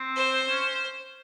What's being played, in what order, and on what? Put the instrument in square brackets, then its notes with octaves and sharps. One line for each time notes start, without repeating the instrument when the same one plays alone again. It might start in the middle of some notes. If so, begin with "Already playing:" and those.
Already playing: [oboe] C4
[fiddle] C5
[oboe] C#4